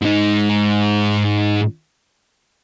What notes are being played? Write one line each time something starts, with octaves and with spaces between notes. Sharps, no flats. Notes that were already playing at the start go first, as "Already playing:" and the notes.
G#2 D#4